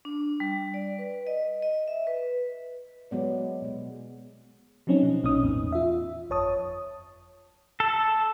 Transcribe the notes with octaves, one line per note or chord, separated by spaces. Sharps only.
D4
G3
D5
B4
D#5
D#5
E5
B4
F#3 G#3 B3 D5
B2 G#3
F3 F#3 C4 C#4 D#4
B2
A#1 A#2 C#4 D#4 D#6
E2 A2 B3
F4 E5
G1 F2 C#5 A5 D#6
A4